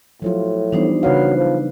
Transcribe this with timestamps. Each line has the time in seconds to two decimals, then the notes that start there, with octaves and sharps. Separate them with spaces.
0.22 A2 F3 F#3 F4
0.72 E3 G3 B3 D4 D#4 C5
1.03 C#3 F#3 B4 F5
1.37 F3